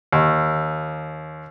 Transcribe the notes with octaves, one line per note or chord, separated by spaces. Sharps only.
D#2